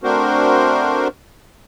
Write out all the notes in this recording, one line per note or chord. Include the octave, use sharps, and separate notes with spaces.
A3 C4 D4 F#4 A#4 C5